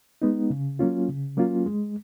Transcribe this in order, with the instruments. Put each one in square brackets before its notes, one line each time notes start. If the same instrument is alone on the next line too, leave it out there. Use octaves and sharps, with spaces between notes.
[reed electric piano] G#3 B3 D#4
C#3
F#3 A#3 C#4 F4
C#3
F#3 A#3 C#4 F4
G#3